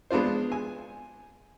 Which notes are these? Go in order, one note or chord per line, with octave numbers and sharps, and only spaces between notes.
G#3 B3 D4 F4 C5
G#5